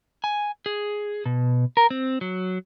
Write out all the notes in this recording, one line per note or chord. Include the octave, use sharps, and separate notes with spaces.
G#5
G#4
B2
A#4
C4
F#3